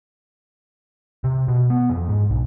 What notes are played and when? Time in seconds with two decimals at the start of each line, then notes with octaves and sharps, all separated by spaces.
1.24 C3
1.48 B2
1.70 B3
1.90 F2
2.09 G#2
2.30 B1